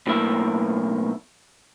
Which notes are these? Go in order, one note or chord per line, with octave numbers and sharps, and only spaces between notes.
B1 A2 A#3 E5